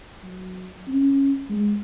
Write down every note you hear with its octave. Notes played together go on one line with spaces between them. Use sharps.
F#3
C#4
G#3